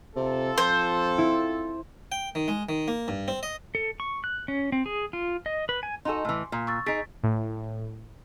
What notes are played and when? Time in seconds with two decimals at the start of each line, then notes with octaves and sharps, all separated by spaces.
0.16 C3 C4 F4 A4
0.58 F2 C5
1.18 E4
2.12 G5
2.35 D#3
2.48 G#3
2.69 D#3
2.88 A#3
3.08 G2
3.28 C4
3.43 D#5
3.75 A4
4.00 C#6
4.24 F#6
4.48 C#4
4.72 C4
4.86 G#4
5.13 F4
5.46 D#5
5.69 B4
5.83 G#5
6.05 D#4 F#4 A4 G#5 C6
6.25 A2 E3
6.52 A#2
6.67 C#6 E6 A6
6.86 D#4 G#4 A6 B6 D7
7.23 A2